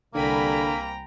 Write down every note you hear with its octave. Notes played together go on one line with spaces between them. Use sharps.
C2 D3 A#3 G5 G#5 A#5 B5